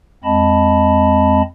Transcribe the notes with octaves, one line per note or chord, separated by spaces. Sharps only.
F2 G#3 C4 D#5 A5 B5